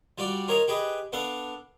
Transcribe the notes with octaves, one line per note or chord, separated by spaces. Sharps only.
G3 F4 F#4 D5
F4 A#4 C#5 D#5 F5
G4 G#4 B4 D#5
B3 D4 A4 F5